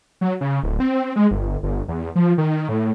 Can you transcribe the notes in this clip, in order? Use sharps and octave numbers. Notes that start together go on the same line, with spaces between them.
F#3
C#3
D1
C4
G#3
G1
G1
E2
F3
D#3
A2